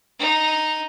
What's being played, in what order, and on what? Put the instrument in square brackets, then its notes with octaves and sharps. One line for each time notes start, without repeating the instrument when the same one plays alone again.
[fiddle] D#4